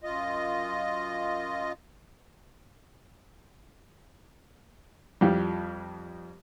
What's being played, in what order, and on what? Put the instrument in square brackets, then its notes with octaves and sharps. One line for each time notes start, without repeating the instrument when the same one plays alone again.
[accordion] F#2 F4 D#5
[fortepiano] F2 F3 G3